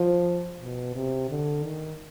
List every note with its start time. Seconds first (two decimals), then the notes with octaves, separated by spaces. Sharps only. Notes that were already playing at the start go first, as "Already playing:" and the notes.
Already playing: F3
0.60 B2
0.95 C3
1.30 D3
1.63 D#3